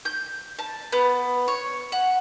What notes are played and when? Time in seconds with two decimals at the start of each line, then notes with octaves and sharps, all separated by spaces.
0.05 G6
0.59 A5
0.92 B3
1.48 C#5
1.92 F#5